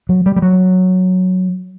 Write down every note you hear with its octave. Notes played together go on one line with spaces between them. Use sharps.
F#3
G3
G3
F#3